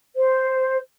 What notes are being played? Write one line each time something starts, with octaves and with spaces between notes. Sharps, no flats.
C5